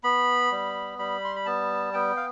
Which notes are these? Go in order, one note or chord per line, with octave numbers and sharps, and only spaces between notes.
B3 B5
G3
G3 B5
C6
B5
B3 A5
B3 G5
F5